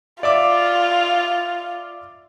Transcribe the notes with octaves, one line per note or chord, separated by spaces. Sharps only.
F4 D5 E5 D6